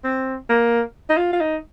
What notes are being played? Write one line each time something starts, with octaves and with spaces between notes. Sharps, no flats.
C4
A#3
D#4
F4
F4
D#4